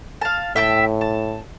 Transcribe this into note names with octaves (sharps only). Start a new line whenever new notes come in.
F5 A5
A2 E5 G5 A5
A5